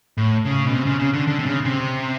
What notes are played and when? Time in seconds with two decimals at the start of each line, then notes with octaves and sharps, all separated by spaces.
0.17 A2
0.45 C#3
0.66 B2
0.73 C3
0.86 C#3
1.00 C#3
1.13 D3
1.28 D3
1.39 C3
1.46 C#3
1.65 C3